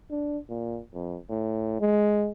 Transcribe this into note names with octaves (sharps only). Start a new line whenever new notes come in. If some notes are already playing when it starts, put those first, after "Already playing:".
D4
A#2
F2
A2
G#3